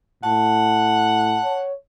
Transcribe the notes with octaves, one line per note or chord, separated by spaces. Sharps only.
A2 F#5 A5
C#5